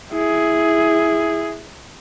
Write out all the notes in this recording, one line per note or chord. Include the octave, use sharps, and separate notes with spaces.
E4 G#4